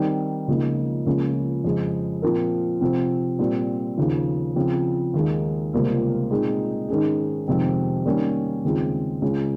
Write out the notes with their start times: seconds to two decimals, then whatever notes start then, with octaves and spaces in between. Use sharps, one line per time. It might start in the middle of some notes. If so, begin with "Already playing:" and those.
Already playing: D#3 G3 C4
0.48 C#2 C#3 F3 A#3 D#4
1.06 C#2 C#3 F3 A#3 C#4
1.64 F2 C#3 G#3
2.22 A#2 F3 C4 F4 A#4
2.81 C3 F3 C4
3.39 A#2 G3 C4 G4
3.98 D#2 C#3 F3
4.56 C#3 F3 C4
5.14 D#2 D#3 G#3
5.73 C#2 C3 G3 A#3 F4
6.31 A#2 G#3 C4 D#4 G#4
6.89 G#2 D#3 G#3 C#4 G#4
7.47 F2 C3 D#3 G#3 C4
8.06 D#3 G3 A#3 C#4
8.65 D#2 C#3 G#3 C4 F4
9.22 C#2 C#3 G#3 C#4